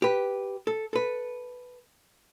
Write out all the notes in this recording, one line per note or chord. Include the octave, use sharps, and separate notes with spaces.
G4 B4
A4
A4 B4